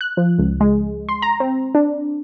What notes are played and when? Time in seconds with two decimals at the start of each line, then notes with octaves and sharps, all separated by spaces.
0.01 F#6
0.17 F3
0.39 C#2
0.61 G#3
1.09 C6
1.22 A#5
1.40 C4
1.75 D4